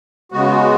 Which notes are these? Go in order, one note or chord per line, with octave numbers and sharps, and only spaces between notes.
C#3 G#3 B3 F#4